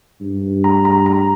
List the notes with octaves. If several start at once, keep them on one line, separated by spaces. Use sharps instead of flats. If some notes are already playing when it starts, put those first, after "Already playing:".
G2
A#5
A#5
A#5